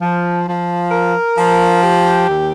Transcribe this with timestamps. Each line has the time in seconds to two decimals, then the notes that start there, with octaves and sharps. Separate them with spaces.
0.01 F3
0.47 F3
0.92 A#4
1.37 F3
1.83 G4
2.28 D#2